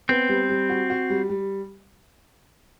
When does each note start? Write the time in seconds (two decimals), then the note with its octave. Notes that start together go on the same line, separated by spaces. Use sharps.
0.09 B3 C4
0.29 G3
0.49 G3
0.70 F#4
0.90 F#4
1.10 G3
1.29 G3